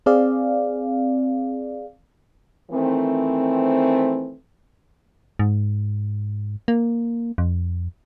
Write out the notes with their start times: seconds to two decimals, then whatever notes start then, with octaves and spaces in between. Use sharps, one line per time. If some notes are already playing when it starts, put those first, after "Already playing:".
0.06 C4 G#4 D5 F5
2.71 D#3 E3 A3 C4
5.39 G#2
6.68 A#3
7.38 F2